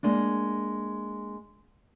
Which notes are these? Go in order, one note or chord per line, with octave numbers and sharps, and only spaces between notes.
G#3 A#3 D4